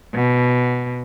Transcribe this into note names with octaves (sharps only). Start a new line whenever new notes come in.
B2